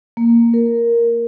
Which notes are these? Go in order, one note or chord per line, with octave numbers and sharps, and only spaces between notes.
A#3
A#4